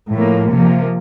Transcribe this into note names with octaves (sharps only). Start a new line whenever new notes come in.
A2 F3 A#3
C3 F3 A#3